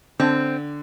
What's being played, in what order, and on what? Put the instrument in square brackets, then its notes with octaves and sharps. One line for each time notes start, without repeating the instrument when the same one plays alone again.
[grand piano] D3 [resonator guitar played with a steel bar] C4